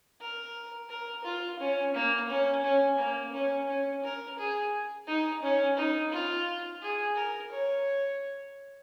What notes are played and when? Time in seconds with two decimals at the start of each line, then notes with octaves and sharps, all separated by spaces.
0.21 A#4
0.90 A#4
1.24 F4
1.59 C#4
1.94 A#3
2.30 C#4
2.64 C#4
2.99 A#3
3.33 C#4
3.68 C#4
4.04 A#4
4.38 G#4
5.08 D#4
5.42 C#4
5.77 D#4
6.12 F4
6.82 G#4
7.16 A#4
7.52 C#5